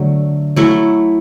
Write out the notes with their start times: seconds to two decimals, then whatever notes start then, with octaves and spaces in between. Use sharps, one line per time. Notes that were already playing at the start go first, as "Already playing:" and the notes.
Already playing: D3 F#3 A3
0.56 F#3 A3 E4 A4